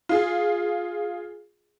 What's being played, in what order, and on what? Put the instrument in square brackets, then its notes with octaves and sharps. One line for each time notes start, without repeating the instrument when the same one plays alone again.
[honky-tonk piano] F4 G#4